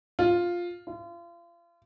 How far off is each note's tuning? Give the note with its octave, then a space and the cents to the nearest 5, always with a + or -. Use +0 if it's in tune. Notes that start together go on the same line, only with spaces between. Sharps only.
F4 +5
F4 -35